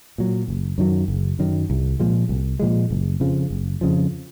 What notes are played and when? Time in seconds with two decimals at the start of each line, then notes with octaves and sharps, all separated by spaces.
0.18 A#2 F#3
0.48 F#1
0.78 F#2 D#3 F#3
1.08 F#1
1.39 F#2 D#3 F#3
1.70 C2
2.00 A#2 F3 G#3
2.29 C2
2.60 A#2 F3 G#3
2.90 F#1
3.20 F2 C#3 F3
3.51 F#1
3.81 F2 C#3 F3